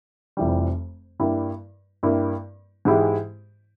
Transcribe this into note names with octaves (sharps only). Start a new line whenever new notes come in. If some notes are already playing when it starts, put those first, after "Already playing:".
F1 F2 E3 G3
G2 G3 A#3 E4
G2 G3 A#3 E4
G#2 E3 G#3 E4 G4